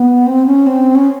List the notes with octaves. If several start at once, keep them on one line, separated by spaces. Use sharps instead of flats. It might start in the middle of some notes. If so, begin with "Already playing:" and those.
Already playing: B3
C4
C#4
C4
C#4